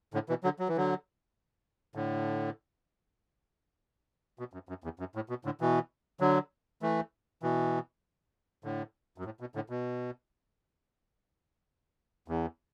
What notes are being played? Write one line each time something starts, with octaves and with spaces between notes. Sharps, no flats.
A2 D3
B2 E3
D3 F#3
F#3
E3
D3 F#3
A2 D3
B2
F#2
F#2
E2
F#2
A2
B2
A2 D3
B2 E3
D3 F#3
E3 A3
B2 E3
A2 D3
F#2
A2
B2
A2 D3
B2
E2